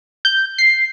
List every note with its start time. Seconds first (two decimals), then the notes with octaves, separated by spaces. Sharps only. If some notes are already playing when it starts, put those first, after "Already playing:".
0.25 G6
0.58 C7